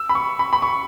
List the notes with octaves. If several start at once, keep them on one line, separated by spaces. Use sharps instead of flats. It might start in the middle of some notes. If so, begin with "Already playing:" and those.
Already playing: E6
B5
C#6
B5
B5
C#6